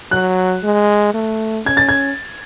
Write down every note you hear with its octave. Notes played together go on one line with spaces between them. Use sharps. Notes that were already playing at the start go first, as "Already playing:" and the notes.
F#3 F#6
G#3
A3
C#4 G#6
A6
G#6